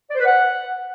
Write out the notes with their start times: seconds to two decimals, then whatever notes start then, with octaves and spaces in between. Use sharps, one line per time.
0.10 D5
0.15 C5
0.20 B4
0.25 F#5